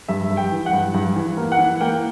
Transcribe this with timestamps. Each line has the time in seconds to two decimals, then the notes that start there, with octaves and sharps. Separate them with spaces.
0.08 G2 E5
0.30 G2
0.37 G5
0.51 E3
0.66 F#5
0.73 G2
0.94 G2
1.16 E3
1.37 A#3
1.52 F#5
1.59 E3
1.80 A#3 G5